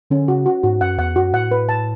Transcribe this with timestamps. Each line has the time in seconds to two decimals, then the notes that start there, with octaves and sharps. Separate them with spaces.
0.10 D3 C#4
0.28 C#3 F#4
0.46 F#4
0.63 G#2 F#4
0.81 F#2 F#5
0.98 E2 F#5
1.16 F#2 F#4
1.33 A2 F#5
1.51 B4
1.69 A5